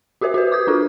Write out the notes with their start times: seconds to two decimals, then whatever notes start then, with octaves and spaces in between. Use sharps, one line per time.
0.21 F#4 G4 A#4 C5 E5
0.34 F#4 G4 B4
0.51 D6 D#6 G6 G#6
0.67 D4 F4 A4 A#4